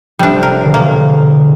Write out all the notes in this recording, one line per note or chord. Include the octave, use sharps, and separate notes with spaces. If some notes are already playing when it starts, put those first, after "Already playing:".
F1 G3 C4 D4
A#4
E1 D3 C7
A#3